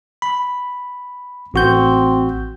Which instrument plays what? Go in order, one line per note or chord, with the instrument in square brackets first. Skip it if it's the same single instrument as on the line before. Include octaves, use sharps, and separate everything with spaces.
[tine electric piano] B5
[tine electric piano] A1 F#4 G6 [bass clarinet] C4